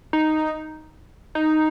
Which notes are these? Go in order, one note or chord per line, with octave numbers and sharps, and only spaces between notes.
D#4
D#4